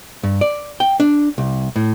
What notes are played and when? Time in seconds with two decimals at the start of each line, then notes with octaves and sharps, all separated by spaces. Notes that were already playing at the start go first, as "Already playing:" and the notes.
0.23 G2
0.41 D5
0.80 G5
1.00 D4
1.38 C2
1.76 A2